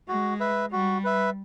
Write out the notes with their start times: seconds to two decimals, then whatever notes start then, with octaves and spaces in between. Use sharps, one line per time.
0.08 G#3 F#4
0.40 B4 E5
0.72 G3 F#4
1.04 B4 E5